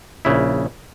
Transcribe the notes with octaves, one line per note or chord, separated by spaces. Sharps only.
A#1 C#3 E4